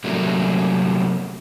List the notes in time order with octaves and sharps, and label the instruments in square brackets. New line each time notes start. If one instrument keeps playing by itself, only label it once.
[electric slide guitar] C3 F#3 G3 A3 A#3 C#4